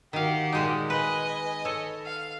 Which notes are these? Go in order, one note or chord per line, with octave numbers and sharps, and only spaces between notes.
D#3 F#4 G4 F5
A#2 G#3 D#4
B4 D#5 G#5
A4 C#5
F5